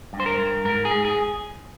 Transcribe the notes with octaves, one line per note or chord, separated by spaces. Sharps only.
G2
C5
A#4
G2
G#2 A#4
G#4
G#2
G#4